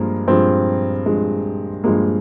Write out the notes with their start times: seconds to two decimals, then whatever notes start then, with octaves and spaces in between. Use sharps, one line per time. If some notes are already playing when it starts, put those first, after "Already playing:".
Already playing: G2 F3 G#3 A#3
0.28 G2 F3 G#3 C4
1.06 G2 F3 G#3
1.84 G2 F3 G#3 A#3